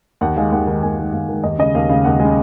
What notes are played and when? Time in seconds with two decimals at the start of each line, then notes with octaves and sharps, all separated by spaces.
0.21 D#2 F#5
0.36 D#3 G#3 F5
0.52 D#2 F#5
0.67 D#3 G#3
0.83 D#2 G#5
0.98 D#3 G#3
1.13 D#2 F5
1.29 D#3 G#3
1.44 D#2 D#5
1.58 C#3 G#3 D#5
1.75 D#2 F5
1.89 C#3 G#3 F5
2.04 D#2 F#5
2.20 G#3
2.25 C#3